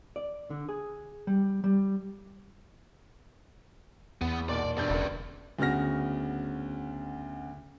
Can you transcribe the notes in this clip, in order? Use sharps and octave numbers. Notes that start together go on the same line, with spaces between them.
D5
D3
G#4
G3
G3
E2 B3
B1 A#2 D5
E1 E2 G2 D5 G6
E1 C#2 F#2 D3
D2 C#3 B3 F#4 F6 A#6